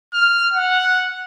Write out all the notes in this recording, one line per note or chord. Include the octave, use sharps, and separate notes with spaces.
F6
F#5